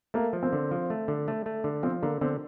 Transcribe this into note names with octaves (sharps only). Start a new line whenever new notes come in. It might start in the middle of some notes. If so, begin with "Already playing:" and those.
A3 A#3
F3
C4
D3
F3
A3
D3
A3
A3
D3
F3 C4
D3 A#3
D3 C4